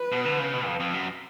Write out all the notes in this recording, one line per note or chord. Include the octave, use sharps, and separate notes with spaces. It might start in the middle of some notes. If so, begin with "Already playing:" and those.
Already playing: B4
B2
D3
C#3
B2
F2
F2
F#2